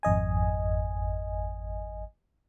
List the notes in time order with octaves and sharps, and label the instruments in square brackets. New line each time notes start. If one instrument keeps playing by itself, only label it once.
[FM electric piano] G#1 F2 D#5 G#5